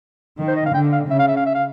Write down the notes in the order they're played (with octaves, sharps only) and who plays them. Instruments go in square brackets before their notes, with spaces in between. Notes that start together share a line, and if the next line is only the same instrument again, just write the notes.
[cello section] D#3
[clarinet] C5
D#5
F5
[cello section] D3 [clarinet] G5
[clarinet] F5
[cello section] C#3 [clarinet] E5
[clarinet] F5
E5
F5
E5
F5